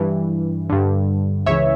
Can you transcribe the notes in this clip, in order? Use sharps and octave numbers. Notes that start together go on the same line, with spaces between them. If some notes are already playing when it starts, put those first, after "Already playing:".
Already playing: G2 E3
G2 D3
C#2 C#3 E3 C#5 E5